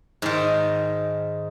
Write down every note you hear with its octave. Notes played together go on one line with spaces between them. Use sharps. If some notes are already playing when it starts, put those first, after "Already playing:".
G#2 D#3